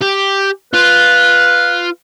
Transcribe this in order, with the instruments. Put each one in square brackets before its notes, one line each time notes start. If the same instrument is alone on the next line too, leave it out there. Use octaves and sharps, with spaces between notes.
[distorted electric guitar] G4
[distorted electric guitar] F4 [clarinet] B4